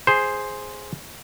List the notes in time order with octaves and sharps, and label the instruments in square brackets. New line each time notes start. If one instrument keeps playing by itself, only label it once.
[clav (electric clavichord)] G#4 C5